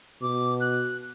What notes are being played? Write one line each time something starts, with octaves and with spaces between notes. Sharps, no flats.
B2 D6
F#6